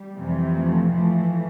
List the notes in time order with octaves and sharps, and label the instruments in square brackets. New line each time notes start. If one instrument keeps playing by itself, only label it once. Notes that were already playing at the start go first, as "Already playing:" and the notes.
Already playing: [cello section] G3
F2 C3 E3
F3 A3
A2 E3 F3 A3